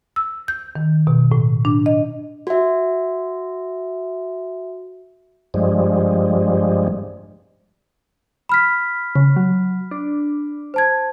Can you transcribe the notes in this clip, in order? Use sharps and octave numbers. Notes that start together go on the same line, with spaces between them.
E6
G6
D#3
B2
A2
D4
D#5
F#4 E5
G2 F3 G3 G#3
B5 F6 B6
C#3
F#3
D4
C5 A5 G#6